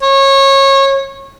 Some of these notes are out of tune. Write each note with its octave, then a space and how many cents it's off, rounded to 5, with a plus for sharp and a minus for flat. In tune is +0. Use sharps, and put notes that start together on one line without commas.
C#5 -25